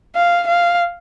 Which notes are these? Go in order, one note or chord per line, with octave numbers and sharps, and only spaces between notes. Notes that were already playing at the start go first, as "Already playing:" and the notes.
F5
F5